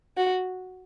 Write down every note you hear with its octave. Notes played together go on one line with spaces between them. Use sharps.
F#4